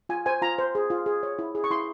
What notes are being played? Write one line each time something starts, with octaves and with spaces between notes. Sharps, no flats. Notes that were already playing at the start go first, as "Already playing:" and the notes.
F4 G#5
C5 G#5
F4 A#5
C5
G#4
F4
G#4
C#5
E4
G#4
C#6
E4 C6